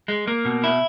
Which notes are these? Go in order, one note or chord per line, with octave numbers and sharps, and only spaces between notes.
G#3
A#3
B2
E4